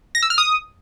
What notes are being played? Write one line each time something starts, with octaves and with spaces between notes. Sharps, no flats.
A#6
E6
F6
D#6